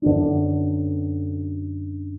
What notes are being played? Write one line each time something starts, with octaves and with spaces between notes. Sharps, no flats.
F#2 D3 B3 D4